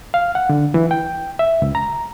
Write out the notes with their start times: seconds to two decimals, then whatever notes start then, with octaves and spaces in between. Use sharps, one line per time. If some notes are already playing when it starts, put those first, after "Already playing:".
0.14 F5
0.35 F#5
0.49 D3
0.74 E3
0.91 G5
1.39 E5
1.62 C#2
1.75 A#5